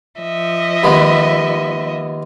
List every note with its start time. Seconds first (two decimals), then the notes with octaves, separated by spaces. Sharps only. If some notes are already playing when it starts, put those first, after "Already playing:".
0.21 F3 D#5 E5
0.84 D#2 G#3 B3